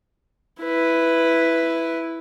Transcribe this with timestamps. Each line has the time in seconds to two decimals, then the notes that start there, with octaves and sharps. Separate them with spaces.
0.61 E4 B4